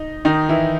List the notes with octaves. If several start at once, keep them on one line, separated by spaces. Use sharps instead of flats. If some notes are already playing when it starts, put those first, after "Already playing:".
Already playing: D#4 D#5
D#3 D#4
E3 E4